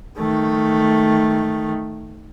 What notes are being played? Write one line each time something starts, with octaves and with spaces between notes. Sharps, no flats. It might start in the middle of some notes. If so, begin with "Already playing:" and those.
D#3 A3